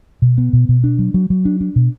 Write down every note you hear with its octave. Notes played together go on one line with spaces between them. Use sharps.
B2
B3
B2
B2
D4
F#3
F#3
F#3
D4
D4
B2